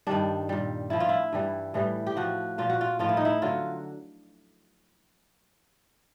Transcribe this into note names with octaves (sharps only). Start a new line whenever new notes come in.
G2 D#3 G3 D4
A#2 G3
A2 F3 E4
F4
E4
G2 E3 G3
A2 E3 G3
G4
A2 F3 F#4
A#2 F3 F4
F#4
F4
A2 F3 F4
E4
D#4
E4
D3 F#3 F4